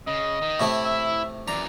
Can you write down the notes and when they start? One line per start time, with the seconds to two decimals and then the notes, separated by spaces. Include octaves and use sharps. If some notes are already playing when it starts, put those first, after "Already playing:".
0.07 C#3 D#5
0.42 D#3
0.60 A2 C3 A3 E4
0.85 E5
1.48 F#2 E3 D5 A#5